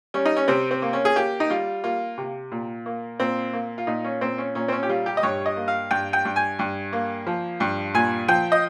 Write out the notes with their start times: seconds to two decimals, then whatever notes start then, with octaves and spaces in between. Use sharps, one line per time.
0.14 G3 C#4
0.25 D#4
0.37 C#4
0.48 C3 C4
0.71 C4
0.82 A#3
0.93 C#4
1.05 G#4
1.16 A#3 G4
1.40 D#4
1.50 G3 F4
1.84 A#3 F4
2.18 C3
2.52 A#2
2.86 A#3
3.20 A#2 C4
3.53 A#3
3.78 F4
3.87 A#2 D#4
4.04 C#4
4.21 A#2 C4
4.38 C#4
4.55 A#2 C#4
4.68 C4
4.72 C#4
4.83 G4
4.89 G3 F4
5.06 G4
5.17 D#5
5.23 G2 C#5
5.46 D#5
5.57 A#3
5.68 F5
5.91 G2 G5
6.13 G5
6.25 G2
6.36 G#5
6.59 G2
6.93 A#3
7.27 F3
7.60 G2
7.94 A#2 G#5
8.28 F3 G5
8.52 D#5